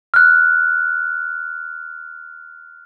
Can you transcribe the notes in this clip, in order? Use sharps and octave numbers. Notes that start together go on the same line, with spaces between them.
F6 F#6